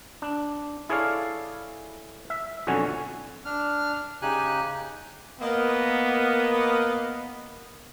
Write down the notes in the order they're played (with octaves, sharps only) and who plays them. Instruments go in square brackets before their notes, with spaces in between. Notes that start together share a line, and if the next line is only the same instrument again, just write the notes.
[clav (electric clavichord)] D4
E4 G#4 A4 C#5 D5 F5
E5
B1 F2 D3 C#4 F#4 G#5
[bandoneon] D4 F6
C#3 D#4 G4 G#5 F#6
[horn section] A#3 D#5 [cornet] B3